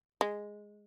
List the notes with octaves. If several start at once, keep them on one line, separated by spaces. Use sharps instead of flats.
G#3